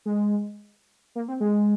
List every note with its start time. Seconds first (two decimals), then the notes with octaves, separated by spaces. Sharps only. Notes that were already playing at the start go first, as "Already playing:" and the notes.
0.06 G#3
1.16 A#3
1.28 C4
1.40 G#3